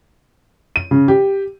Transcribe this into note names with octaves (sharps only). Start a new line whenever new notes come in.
D#7
C#3
G4